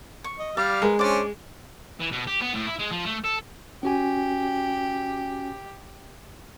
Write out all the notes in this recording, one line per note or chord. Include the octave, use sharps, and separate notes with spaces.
C#6
D#5
G3 D5 F5 F6
G#3 A#4 B4
C#4 D4 C5 D5 D6
E3
B2
G4
B3
A2
E4
G#3
F3
A3
A4
C#4 F#4 G4 G#5